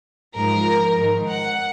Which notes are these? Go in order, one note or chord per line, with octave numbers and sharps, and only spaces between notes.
G#2 F3 A#4
G#2 D#3
F#5